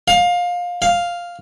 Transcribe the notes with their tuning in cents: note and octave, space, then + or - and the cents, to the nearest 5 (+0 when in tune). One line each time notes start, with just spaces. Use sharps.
F5 +20
F5 +0